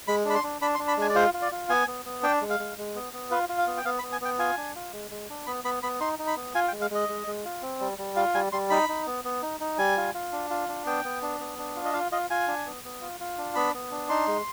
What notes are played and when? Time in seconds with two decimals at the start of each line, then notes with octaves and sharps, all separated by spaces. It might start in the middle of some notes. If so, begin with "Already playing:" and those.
0.08 G#3 B5
0.25 D4 B5
0.35 C6
0.43 D4
0.61 D4 B5
0.75 C6
0.79 D4
0.88 B5
0.97 G#3 G#5
1.09 D5
1.15 F4 C5
1.34 F4
1.42 D5
1.52 F4
1.69 B3 G#5
1.87 B3
2.05 B3
2.23 D4 G5
2.42 G#3
2.50 F5
2.59 G#3
2.78 G#3
2.95 B3
3.13 B3
3.31 F4 B4
3.49 F4
3.58 F5
3.67 B3
3.77 G5
3.85 B3 F5
3.99 B5
4.03 B3
4.12 G#5
4.21 B3 G5
4.39 F4 G#5
4.57 D4
4.75 F4
4.93 G#3
5.11 G#3
5.29 D4
5.46 B3 B5
5.64 B3 B5
5.83 B3 B5
6.01 D#4 C6
6.19 D#4
6.27 B5
6.37 B3
6.55 F4 G#5
6.68 G5
6.72 G#3
6.81 F5
6.90 G#3 D#5
7.09 G#3
7.27 G#3
7.45 F4
7.62 C4
7.80 G3
7.98 G3
8.16 F4 F5
8.35 G3 G#5
8.53 G3 C6
8.70 D#4 B5
8.89 D#4
9.06 B3
9.24 B3
9.42 D#4
9.60 D#4
9.78 G3 G#5
9.97 F4
10.14 F4
10.32 D4
10.50 F4
10.68 D4
10.86 B3 G5
11.04 B3
11.22 D4
11.40 B3
11.58 D4
11.76 F4
11.85 D#5
11.93 F4 F5
12.12 F4 D#5
12.30 F4 G#5
12.48 D4
12.66 B3
12.84 B3
13.01 F4
13.20 F4
13.38 D4
13.55 B3 B5
13.74 B3
13.91 D4
14.09 D#4 C6
14.27 G#3